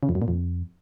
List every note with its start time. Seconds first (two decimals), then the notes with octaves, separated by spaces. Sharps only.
0.03 C#3
0.09 F2
0.15 F#2
0.22 A#2
0.28 F2